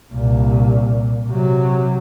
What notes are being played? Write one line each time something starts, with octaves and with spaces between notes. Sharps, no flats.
C2 A#2
C3 F#3